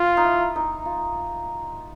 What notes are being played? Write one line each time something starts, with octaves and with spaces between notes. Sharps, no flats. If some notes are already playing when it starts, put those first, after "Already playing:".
Already playing: F4
D#4
E4
D#4
F4